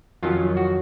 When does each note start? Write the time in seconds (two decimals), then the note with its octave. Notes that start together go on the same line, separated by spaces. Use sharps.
0.23 F2 D#3 F#3 C#4 F4
0.57 F#4